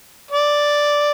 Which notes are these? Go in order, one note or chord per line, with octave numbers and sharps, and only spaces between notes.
D5